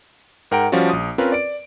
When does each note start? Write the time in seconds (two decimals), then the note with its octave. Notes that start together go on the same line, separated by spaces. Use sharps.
0.51 G#2 A#4 F#5 G5 A#5 D7
0.72 F3 G3 C#4 F4 F#4
0.89 A#1 D#6
1.18 C4 C#4 F4 A#4 B4
1.32 D5 D7